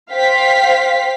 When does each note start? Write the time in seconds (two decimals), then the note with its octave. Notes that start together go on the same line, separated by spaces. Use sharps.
0.13 C5 F5 G5 B6